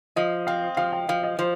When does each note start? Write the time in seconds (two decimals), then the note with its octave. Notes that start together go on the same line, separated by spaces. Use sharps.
0.16 F3 D#5
0.47 C4 F5
0.77 F3 F5
0.92 G5
1.09 F3 F5
1.23 D#5
1.39 F3 C5